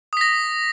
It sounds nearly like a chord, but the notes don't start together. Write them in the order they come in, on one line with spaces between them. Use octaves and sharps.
D#6 B6 A#6